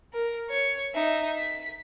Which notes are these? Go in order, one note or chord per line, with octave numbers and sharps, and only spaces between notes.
A#4
C#5
D#4 E5
B6